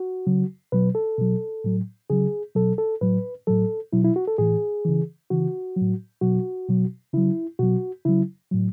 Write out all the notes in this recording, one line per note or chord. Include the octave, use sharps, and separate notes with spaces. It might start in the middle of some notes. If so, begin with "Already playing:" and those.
Already playing: F#4
C#3 F#3
B2 F#3 B4
A4
B2 F#3
A2 F#3
C#3 F#3 G#4
B2 F#3 A4
A4
A2 F#3 B4
A2 F#3 A4
B2 F#3 E4
E4
F#4
A4
A2 E3 G#4
C#3 E3
C#3 E3 F#4
A2 F#3
B2 F#3 F#4
B2 F#3
C#3 F#3 E4
B2 F#3 F#4
C#3 F#3 E4
A2 F#3